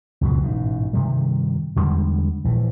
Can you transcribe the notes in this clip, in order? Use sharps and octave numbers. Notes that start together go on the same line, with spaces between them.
C#2 F#2 B2 G#3
A1 G#2 B2
G2 C3 D#3 G3
E2 D3 G3 G#3
A#1 E3